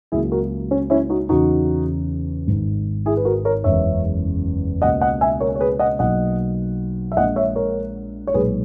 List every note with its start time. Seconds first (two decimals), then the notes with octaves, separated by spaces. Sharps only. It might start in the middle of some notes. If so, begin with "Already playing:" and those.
0.12 C#2 C#3 F#3 A#3 E4 G#4
0.32 F#4 A#4
0.71 C#4
0.90 C#4 E4
1.10 D#4 F#4
1.29 E2 C#3 E3 D#4 F#4
2.47 G#1 G#2 D#3
3.06 E4 G#4
3.17 B4
3.25 F#4 A#4
3.45 A#4 C#5
3.64 F#1 E2 C#3 G#3 C#5 E5
4.82 C#2 B2 A#3 D#5 F#5
5.01 D#5 F#5
5.21 E5 G#5
5.40 A#4 C#5
5.55 C#5
5.60 G#4 B4
5.79 D#5 F#5
5.99 B1 B2 A#3 D#5 F#5
7.12 E5
7.17 A#1 A#2 G#3 D#5 F#5
7.36 C#5 E5
7.56 A#4 C#5
8.27 C#5
8.34 B1 A#2 G#3 G#4 B4